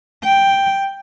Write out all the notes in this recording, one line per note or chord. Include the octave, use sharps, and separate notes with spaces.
G5